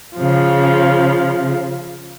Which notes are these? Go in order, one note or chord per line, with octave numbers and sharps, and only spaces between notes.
C#3 F3